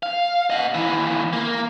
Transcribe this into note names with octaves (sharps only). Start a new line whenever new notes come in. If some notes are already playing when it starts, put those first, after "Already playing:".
F5
D#5 F#5
D#2 E3
A#3